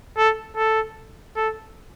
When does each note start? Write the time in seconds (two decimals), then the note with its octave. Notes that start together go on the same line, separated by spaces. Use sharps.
0.18 A4
0.57 A4
1.36 A4